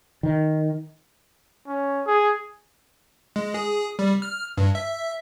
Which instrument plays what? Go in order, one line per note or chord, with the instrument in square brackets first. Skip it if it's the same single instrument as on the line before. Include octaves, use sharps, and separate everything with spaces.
[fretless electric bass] D#3
[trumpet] C#4
G#4
[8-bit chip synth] G#3
G#4
G3
F6
G2
E5